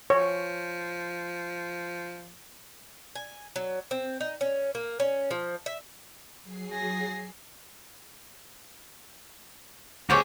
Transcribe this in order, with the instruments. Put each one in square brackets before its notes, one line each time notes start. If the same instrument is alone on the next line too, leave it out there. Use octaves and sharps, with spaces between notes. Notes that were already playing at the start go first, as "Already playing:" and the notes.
[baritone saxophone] F3 [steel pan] C#5
[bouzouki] G#5
F#3
C4
D#4
C#4
A#3
C#4
F3
E5
[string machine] F#3 G#4 C7
[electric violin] G#5 A#6
[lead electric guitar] D2 G#4 [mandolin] C4 G4 C#5 [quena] D6